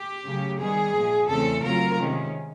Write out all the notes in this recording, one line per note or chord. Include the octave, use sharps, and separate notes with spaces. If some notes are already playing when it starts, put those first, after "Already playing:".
Already playing: G4
C#3 F#3 A3
D#3 G3 B3 G#4
A#2 F3 G#3
E2 C#3 E3 A3 C4 A4
C#3 F#3 A3 C4 F4 A#4
C3 D#3 G#3 C#4